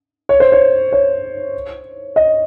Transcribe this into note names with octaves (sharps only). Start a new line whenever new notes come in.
C#5
C5
C#5
C#5
D#5